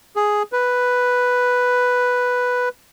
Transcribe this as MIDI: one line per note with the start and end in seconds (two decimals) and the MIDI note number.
0.16 0.43 68
0.52 2.69 71